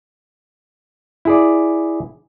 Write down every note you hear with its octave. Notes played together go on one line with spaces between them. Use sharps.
E4 G#4 D5